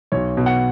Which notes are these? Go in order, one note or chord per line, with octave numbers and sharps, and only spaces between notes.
B1 C#5
B2
F#5